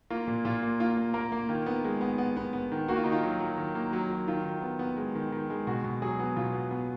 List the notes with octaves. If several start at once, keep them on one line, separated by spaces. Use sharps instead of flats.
A#3 F4
A#2
A#2 F4
A#3
A#3 F4
A#3
A#3 A#4
A#3
D#3 F4
B3
G#3
B3
B3
B3
B3
D#3
A#3 F#4
F4
D#3 D#4
F4
F#3
F#3
D#3
A#3
F#3
F#3
D#3 F4
D#3
B3
B3
G#3
D#3
D#3
G#3
B2 F#4
B2
F#3 G#4
B3
B2 F4
B3
B3